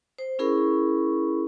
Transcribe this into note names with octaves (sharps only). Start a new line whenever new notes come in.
C5
C#4 E4 G#4 A#4 B5 C#6